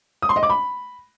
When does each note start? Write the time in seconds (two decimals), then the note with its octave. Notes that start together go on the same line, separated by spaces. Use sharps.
0.22 D#6
0.29 C6
0.36 D#5
0.43 D6
0.50 B5